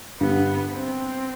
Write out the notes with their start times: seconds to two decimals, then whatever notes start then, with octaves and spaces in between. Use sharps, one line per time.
0.20 G2 D3 G3 B3
0.72 C4